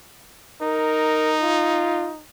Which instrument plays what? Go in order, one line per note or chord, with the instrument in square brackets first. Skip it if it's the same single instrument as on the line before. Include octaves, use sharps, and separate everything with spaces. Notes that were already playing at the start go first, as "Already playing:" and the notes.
[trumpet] D#4 [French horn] A#4
[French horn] F4